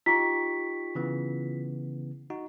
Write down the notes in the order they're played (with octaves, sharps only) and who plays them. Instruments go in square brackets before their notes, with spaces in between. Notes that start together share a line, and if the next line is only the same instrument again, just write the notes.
[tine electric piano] D#4 G4 C#6 [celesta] F4 B6
[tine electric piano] C#3 E3 B3
D#4 F#4